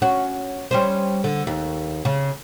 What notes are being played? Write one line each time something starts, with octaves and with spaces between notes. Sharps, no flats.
C#4 F#4
G3 C#4 C5
D3
D#2
C#3